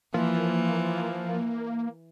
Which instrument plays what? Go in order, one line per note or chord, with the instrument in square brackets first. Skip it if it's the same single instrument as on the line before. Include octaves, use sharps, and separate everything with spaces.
[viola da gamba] E3 [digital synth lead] F3 [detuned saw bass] A#3